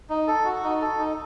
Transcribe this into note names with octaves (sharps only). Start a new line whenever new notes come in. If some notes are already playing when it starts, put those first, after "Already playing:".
D#4
A4
F#4
D#4
A4
D#4